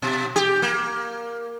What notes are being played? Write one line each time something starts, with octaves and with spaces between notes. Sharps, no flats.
B2
G4
A#3